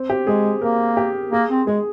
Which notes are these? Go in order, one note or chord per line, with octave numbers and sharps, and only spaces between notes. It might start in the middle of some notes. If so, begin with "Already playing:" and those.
Already playing: C4
G4
G#3 G#4
A#3 A#4
G4
A#3 G#4
C4
G#3 G#4